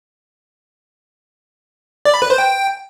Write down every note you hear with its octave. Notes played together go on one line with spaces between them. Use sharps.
D5
B5
B4
C5
G5